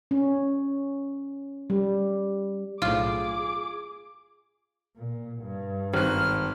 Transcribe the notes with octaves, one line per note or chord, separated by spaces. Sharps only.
C#4
G3
B1 A2 F4 G#4 D6
A#2
G2
G#1 F6 F#6